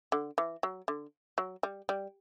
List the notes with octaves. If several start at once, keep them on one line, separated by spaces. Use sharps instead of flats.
D3
E3
F#3
D3
F#3
G3
G3